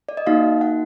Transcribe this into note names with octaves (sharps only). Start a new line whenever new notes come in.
D5
D#5
A#3 D#4 F#4 F5
F#5